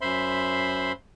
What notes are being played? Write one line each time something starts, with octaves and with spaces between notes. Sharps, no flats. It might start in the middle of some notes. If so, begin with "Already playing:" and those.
F#2 C5 E5 B5 C6